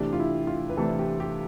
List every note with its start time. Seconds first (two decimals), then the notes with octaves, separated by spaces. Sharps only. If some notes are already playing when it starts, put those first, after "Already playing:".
Already playing: C3 E3 A3 D4 G4
0.13 F4
0.20 E4
0.47 F4
0.70 B4
0.77 C3 E3 A3 D4 A4
0.99 G4
1.20 G4